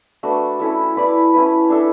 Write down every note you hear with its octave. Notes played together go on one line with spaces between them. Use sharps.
A3 D4 F#4 B4
C#4 E4 A4
E4 B4 D5
C#4 E4 B4
D4 A4 E5